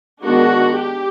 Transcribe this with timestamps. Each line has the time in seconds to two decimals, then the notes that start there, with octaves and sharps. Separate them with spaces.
0.23 D#3 G#3 B3 D4 F#4
0.76 G4